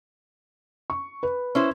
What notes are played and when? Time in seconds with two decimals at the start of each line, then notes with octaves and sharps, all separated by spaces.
0.90 C#6
1.23 B4
1.55 C#4 E4 C5